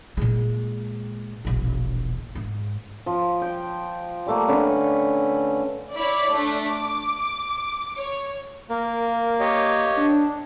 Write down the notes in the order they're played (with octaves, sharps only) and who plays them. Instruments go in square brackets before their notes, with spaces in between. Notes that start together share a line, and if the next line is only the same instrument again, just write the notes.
[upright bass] A#2 G#3
E1 A#1
G#2
[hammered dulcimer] F3
G5
G3 A3 A#3
D3 C#4 B4
[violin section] E4 C#5 D5 B5 D6
A3 D4
D6
C#5
[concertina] A#3 [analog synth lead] A#4
[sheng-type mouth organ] G4 C#5 D#5
[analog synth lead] D4